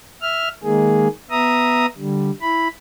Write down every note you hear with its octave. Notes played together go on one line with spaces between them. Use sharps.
E5 F6
D#3 G#3 A#3 G#4
B3 E5 A#5 D#6
D3 G3
E4 B5